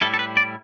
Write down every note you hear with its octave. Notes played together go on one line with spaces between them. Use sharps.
A2 G3 E4 A4
A4
B4
D5